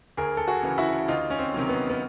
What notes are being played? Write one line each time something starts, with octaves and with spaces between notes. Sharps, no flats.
D2 G#4 A#4
A4
F#4 G#4
C#3 E3
E4 F#4
D2 D#4 F4
C#4
C4
C3 D#3 F#3
B3
B3